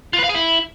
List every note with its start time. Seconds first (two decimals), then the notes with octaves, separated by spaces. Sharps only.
0.13 F4
0.19 B4
0.24 F5
0.29 G#4
0.34 E4